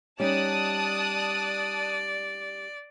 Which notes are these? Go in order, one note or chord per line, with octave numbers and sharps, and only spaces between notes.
G3 C#4 D#4 D5 A5 D#6 F#6